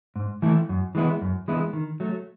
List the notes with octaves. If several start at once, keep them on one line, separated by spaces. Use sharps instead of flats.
G#2
E3 A3 E4
F#2
E3 G#3 B3 E4
F#2
E3 G#3 B3 E4
D#3
F#3 A3